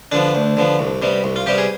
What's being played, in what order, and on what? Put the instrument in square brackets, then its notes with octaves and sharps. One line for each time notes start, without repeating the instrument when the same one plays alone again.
[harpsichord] D3 F3 B3 D4
D2
D3 F3 B3
C2
C3 G3 B3
C2
F4
C3 G3 B3 G4
G#4